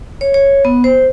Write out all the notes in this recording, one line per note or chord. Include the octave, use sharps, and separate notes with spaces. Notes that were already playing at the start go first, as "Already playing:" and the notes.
C#5
C#5
B3
C5